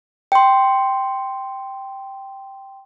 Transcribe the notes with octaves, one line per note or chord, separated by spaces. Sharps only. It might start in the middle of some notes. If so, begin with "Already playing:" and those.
G5 C6